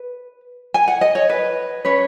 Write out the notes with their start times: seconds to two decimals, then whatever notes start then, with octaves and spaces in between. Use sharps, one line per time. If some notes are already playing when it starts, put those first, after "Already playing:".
Already playing: B4
0.74 G#5
0.88 F#5
1.01 D#5
1.15 C#5
1.29 B4
1.85 C#4 B4 C#5